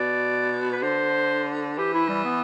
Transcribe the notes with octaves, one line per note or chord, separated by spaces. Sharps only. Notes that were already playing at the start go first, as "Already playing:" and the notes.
Already playing: B2 D5
B4
D3 C5
E3 G4
E4
G3
B3